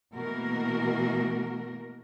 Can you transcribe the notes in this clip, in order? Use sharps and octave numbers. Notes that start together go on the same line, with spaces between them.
B2 E3 A3 A#3 F#4 A#4